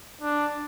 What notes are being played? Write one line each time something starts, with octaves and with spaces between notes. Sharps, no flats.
D4